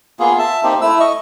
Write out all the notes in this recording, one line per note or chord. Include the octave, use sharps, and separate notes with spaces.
A#3 B3 F4 G#4
E5 A5
A#3 C4 D#4 G4
A3 E4 E6
D#5 C#6